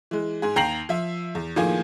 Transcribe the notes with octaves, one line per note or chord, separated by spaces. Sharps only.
E3 G#3
G#2 G#4
D#2 G5 A#5 C7 F7 F#7
F3 E5
E2
A2 D#3 F3 A#3 F4 G#4